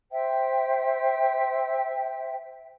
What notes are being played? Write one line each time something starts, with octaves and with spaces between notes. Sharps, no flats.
C5 E5 G5